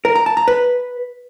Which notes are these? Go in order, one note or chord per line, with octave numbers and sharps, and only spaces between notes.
A#4
A#5
A5
A#5
B4